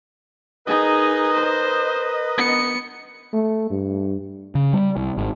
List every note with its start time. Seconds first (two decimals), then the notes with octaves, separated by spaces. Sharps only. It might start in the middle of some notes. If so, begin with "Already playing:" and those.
0.67 D#4 G#4 A#4 B4 D#5
1.35 C5
2.37 B3 C#7
3.33 A3
3.70 G2
4.55 C#3
4.73 G3
4.97 C2
5.18 G#1